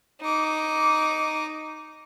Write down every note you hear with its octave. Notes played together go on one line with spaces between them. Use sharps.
D#4 D6